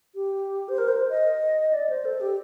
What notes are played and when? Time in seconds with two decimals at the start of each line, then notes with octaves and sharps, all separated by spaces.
0.15 G4
0.68 C5
0.78 A#4
0.88 C5
1.10 D#5
1.73 D5
1.90 C5
2.05 A4
2.21 G4